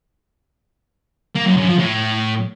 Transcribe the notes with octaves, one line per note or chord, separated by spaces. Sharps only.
A#3
F#2
F#2
F3
A2